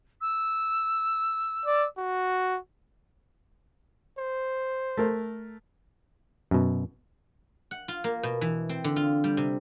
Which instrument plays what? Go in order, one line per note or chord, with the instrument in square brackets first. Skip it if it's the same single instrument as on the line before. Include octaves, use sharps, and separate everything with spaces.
[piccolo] E6
[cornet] D5
F#4
[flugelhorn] C5
[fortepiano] A3 A#4
[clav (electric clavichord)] F#2 B2
[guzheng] F#5
F4
A#3
B2
E3
C4
D3
F4
G3
C3